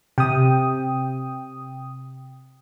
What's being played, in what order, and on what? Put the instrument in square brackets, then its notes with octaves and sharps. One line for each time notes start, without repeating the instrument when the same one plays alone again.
[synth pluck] C3 [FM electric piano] G5 D#6